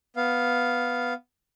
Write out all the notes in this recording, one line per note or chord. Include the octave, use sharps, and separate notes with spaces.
B3 F5